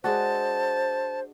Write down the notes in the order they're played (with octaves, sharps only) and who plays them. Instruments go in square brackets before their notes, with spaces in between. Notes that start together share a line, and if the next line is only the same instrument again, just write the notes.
[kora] G#3 D4 F#4 [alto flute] C5 [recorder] A5